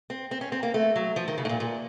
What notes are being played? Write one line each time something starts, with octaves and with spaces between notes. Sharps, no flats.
C4
C4
C#4
C4
A#3
A3
F#3
F3
D#3
C#3
A2
A#2
A#2